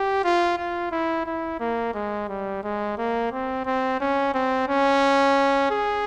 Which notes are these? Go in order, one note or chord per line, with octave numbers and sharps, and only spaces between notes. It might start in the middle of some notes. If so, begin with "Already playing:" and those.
Already playing: G4
F4
F4
E4
E4
A#3
G#3
G3
G#3
A#3
C4
C4
C#4
C4
C#4
G#4